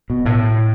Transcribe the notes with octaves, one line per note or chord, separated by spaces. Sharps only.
B2
A2